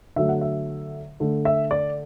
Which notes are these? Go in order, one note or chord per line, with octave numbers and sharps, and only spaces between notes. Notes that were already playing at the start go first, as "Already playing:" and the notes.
D3 F#3 A3 E5
F#5
E5
D3 A3
E5
D5